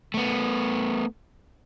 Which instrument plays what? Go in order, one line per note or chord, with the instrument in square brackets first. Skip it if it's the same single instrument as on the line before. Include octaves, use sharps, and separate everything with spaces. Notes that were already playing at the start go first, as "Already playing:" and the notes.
[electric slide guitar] A3 B3